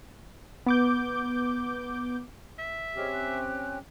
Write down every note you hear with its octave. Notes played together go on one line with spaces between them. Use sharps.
B3 D6 G6
E5
C4 C#4 G4 G#4 D#5 F6
G5 F#6